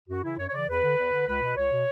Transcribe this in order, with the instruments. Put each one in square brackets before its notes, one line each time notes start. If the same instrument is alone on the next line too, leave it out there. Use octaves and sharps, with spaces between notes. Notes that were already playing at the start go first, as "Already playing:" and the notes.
[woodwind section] F#2 F#4
C#3 E3 E4
F#2 C#5
C#5
C#3 E3 D5
E2 B4
D3
E2
D3
C#2 B4
B2
C#2 C#5
B2